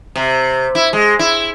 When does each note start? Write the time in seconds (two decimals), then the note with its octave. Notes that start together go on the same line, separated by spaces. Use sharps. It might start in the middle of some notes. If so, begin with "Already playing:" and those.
0.16 C3
0.75 E4
0.93 G#3
1.19 E4